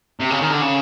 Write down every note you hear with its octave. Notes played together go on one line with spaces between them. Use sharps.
C3
C#3
D#3
D3
C#3